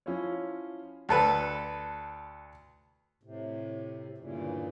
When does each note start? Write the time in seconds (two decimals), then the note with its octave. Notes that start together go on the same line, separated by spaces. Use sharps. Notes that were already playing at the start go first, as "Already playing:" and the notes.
0.06 F3 C#4 E4 F4 C#5
1.09 D2 A4 B4
3.23 A2 C3
4.18 D2 G2 A#2 C#3 E3